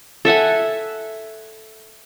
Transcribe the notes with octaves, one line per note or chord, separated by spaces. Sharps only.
A4 E5 F#5 G#5